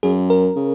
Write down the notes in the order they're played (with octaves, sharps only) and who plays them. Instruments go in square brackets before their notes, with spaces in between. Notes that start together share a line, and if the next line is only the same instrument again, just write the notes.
[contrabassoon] F#2 [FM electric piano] G#4
[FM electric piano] A#4
[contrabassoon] C#3